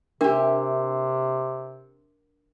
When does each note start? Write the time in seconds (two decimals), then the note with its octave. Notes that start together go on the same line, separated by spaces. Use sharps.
0.21 C3 D4 G4 A#4 E5